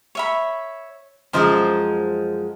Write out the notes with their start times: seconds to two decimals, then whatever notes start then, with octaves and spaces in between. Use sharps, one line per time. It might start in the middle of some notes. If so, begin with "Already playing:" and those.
0.15 C#5 E5 B5
1.33 F#2 F3 G#3 A#4 C5 D#5